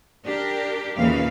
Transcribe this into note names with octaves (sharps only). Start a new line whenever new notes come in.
D4 G4 A#4
D#2 A#2 C#3 E3 B4 F5